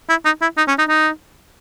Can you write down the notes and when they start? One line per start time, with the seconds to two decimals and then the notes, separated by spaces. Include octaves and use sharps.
0.09 E4
0.25 D#4
0.42 E4
0.57 D#4
0.68 C#4
0.78 D#4
0.89 D#4